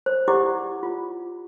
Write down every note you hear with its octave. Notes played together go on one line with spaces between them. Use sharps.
C5
E4 G4 D5 F#5 D6
F4